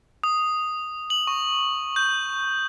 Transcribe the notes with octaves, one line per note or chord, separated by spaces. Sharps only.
D#6
F#7
C#6
G6